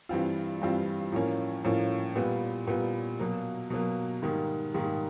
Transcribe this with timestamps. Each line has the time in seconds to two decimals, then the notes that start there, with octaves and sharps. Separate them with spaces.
0.09 G2 E3 G3 C4 F4
0.61 G2 E3 G3 C4 F4
1.12 A2 F3 A#3 C#4
1.64 A2 F3 A#3 C#4
2.16 A#2 G3 B3
2.67 A#2 G3 B3
3.19 B2 F#3 A#3
3.70 B2 F#3 A#3
4.22 G#2 D#3 G3 A#3
4.74 G#2 D#3 G3 A#3